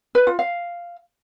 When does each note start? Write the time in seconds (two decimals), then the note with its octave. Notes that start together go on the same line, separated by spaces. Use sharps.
0.15 B4
0.27 F4
0.39 F5